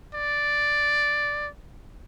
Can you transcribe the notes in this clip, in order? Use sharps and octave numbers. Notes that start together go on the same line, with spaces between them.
D5